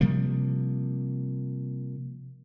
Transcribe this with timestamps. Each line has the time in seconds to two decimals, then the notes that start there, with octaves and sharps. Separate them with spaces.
0.01 C3 F3 G3 A#3